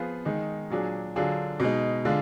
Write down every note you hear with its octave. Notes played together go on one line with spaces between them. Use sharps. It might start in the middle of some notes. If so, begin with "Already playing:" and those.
Already playing: F3 B3 F4 G#4
D#3 G#3 D#4
A#2 F#3 D4 G#4
D3 F#3 D4 F4 G#4
B2 G#3 D#4
D3 G#3 D4 F4